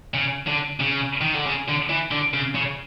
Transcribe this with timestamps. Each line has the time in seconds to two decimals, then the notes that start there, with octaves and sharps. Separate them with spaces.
0.14 C#3
0.48 D3
0.81 C#3
1.21 D#3
1.34 D3
1.46 C#3
1.68 D3
1.89 E3
2.11 D3
2.34 C#3
2.55 C#3